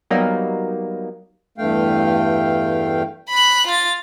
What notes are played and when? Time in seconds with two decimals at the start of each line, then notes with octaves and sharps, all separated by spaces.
0.11 F#3 G3 A#3 B3 D#4
1.58 E2 G2 A3 F5 G5
3.30 B5 F#6
3.67 F4 A6